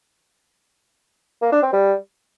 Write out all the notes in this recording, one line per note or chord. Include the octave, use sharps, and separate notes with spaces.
A#3
D4
C4
G3